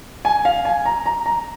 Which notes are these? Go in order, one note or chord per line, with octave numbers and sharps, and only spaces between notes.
G#5
F5
G#5
A#5
A#5
A#5